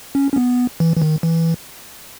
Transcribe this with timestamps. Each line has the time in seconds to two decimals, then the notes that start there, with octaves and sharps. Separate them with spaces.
0.15 C#4
0.33 C#4
0.36 B3
0.80 E3
0.97 E3
1.02 D#3
1.23 E3